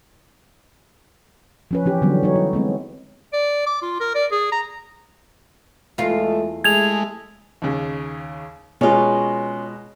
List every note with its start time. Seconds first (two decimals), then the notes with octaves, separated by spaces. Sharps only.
1.71 F3 C#4 B4
1.86 E3 C#4 G4
2.02 D3 E3 F#3 G3 B3
2.23 F#3 D#4 C#5
2.35 E4
2.53 G#3 B3 C4
3.33 D5
3.66 D6
3.82 F4
4.00 A#4
4.15 D5
4.32 G#4
4.52 A#5
5.98 E2 G#3 A3 F4
6.64 G#3 A3 E4 G4 G#4 G#6 F7
7.62 D#2 C#3
8.81 B2 G#3 C#4 F4